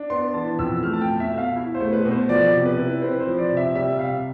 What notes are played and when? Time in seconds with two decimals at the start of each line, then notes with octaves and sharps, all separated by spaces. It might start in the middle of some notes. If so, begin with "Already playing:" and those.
Already playing: D4
0.10 B3 C6
0.34 E3 A5
0.59 F2 E6
0.83 A3 F6
0.93 A5
1.01 G5
1.08 B2
1.20 E5
1.31 B2
1.38 F5
1.56 E4
1.75 C5
1.80 A3
1.93 B4
2.05 B2
2.11 C5
2.29 F3 D5
2.54 C3
2.66 B4
2.78 E4
3.02 C4 B4
3.20 C5
3.27 F3
3.38 D5
3.51 C3
3.57 E5
3.75 G3 E5
3.99 C3 F5